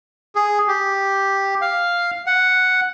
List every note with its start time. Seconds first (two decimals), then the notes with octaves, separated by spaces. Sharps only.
0.35 G#4
0.68 G4
1.61 F5
2.27 F#5